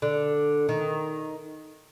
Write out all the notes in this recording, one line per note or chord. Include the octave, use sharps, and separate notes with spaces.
D3
D#3